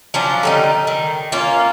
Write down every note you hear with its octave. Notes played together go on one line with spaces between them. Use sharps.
F3 F#3 C#4 D4
D3 G3 D#4
D#3
A#3 C#4 F4